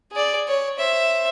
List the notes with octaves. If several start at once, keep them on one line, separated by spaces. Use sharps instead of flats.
G#4 D5
C#5
C5 E5